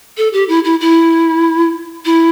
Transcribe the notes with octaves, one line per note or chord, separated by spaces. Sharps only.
A4
G4
E4
E4
E4
E4